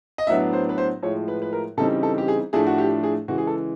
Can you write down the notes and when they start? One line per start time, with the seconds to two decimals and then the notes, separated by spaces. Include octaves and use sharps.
0.18 D#5
0.27 A2 F#3 B3 D4 E5
0.53 C5
0.69 B4
0.78 C5
1.03 A2 F3 G#3 C#5
1.28 B4
1.42 B4
1.53 A#4
1.77 C#3 E3 G3 C4 D#4 A4
2.03 A4
2.18 G4
2.28 G#4
2.53 A2 F3 A3 D4 G#4
2.67 F#4
2.78 G4
3.03 G#4
3.28 C#3 E3 G#3 F#4
3.38 G#4
3.47 A4